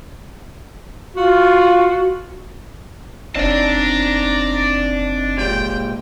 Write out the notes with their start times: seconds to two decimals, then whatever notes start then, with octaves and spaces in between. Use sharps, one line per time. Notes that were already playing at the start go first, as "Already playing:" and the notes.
1.16 F4 F#4
3.35 F#1 C4 D4 D#4 D5 A5 A#5
5.38 A#2 G#3 G4 G5